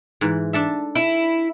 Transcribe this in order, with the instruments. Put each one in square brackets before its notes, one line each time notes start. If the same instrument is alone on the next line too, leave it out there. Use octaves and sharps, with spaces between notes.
[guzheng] G#2 E3
D4 A4 E5
[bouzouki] E4